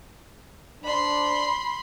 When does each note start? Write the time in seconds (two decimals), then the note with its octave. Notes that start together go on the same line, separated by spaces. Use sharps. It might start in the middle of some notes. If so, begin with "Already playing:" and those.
0.84 D4 C5 D5 B5 C6